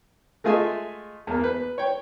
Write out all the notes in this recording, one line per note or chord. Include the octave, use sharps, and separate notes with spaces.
G#3 A3 F4 G#4 D#5 E5
E2 A#3
B4
C#5 G5